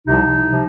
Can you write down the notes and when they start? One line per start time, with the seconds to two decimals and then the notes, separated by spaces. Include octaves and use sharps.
0.06 C2 C3 F3 D#4
0.49 C3 F3